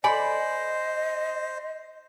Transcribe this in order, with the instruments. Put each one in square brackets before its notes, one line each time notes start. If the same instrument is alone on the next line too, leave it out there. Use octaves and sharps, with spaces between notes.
[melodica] C5 [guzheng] D5 B5 [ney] D#5 [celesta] G#5